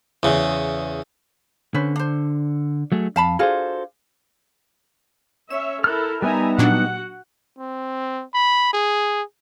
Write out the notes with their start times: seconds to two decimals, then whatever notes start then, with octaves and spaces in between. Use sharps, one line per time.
0.23 E2 C#3
1.74 D3 C#4 B4 C5
1.96 D4 C5
2.92 F#3 A3 G#4
3.16 F2 F5 A5 B5
3.39 D4 F4 F#4 G#4 A4 C5
5.50 C#4 C#5 E5 E7
5.84 E4 A4 A#4 F6 F#6
6.22 G3 B3 D#4 E5 G#5 A#5
6.58 A#2 F#3 D4 F#4 F#5
7.59 C4
8.34 B5
8.73 G#4